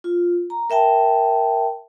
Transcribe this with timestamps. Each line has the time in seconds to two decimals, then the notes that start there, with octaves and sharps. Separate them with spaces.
0.04 F4
0.50 A#5
0.70 A#4 E5 G5 A5